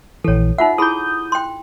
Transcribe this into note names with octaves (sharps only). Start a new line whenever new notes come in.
A#1 E3 A4 C#5
D#4 F4 E5 F#5
E4 G#4 B5 D#6 G6
G5 C6